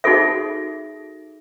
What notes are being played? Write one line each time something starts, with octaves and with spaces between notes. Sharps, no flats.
D#4 F#4 G#4 A4 E5